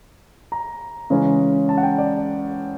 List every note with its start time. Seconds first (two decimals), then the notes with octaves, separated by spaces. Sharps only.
0.52 A#5
1.10 C#3 E3 G#3 C#4
1.69 A5
1.78 F#5
1.83 G5
1.98 D5